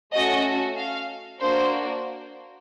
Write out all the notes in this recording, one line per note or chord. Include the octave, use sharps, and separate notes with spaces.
A3 C#4 F#4 A4 D#5
F5
A#3 D4 F#4 C5